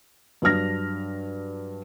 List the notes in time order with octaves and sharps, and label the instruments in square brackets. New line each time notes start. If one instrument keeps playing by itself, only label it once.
[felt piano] G2 F#3 D4 F6 A#6